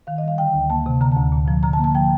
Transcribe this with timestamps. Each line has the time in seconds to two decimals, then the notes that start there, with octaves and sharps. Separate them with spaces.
0.07 D#3 F5
0.18 D#5
0.23 G3 F5
0.38 D3 G5
0.54 D2
0.70 A#3 A5
0.86 C3
1.01 D3 A#5
1.12 D2 A5
1.32 A#2
1.48 F3
1.63 D3 A#5
1.73 A5
1.79 A#3
1.84 A5
1.95 F3 G5